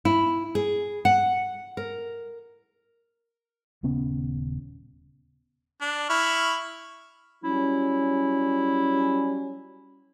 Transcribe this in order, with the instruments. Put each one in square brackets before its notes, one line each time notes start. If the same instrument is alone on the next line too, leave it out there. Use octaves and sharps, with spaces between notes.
[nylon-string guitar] E4
G#4
F#5
A#4
[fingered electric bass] D#1 C#3 B3 C#4
[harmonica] D4
E4 C#6 F6
[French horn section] F#3 G3 C#4 [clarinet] E4